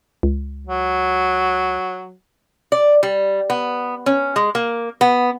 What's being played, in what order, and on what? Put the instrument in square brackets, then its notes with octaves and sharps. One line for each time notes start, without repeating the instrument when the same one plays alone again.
[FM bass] C#2
[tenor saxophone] F#3
[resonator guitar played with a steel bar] D5
G3
B3
C#4
G#3
A#3
B3